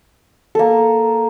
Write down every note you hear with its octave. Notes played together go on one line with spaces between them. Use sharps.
A#3 A4